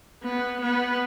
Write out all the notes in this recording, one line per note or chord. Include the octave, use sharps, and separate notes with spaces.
B3
B3